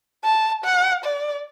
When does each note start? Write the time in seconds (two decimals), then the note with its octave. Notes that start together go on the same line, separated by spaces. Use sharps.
0.25 A5
0.65 F#5
1.05 D5